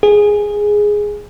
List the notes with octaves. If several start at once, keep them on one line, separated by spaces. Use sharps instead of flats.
G#4